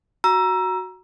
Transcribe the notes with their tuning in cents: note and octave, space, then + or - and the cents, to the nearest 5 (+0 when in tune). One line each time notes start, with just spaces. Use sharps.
F#4 +0 A#5 +15 E6 +20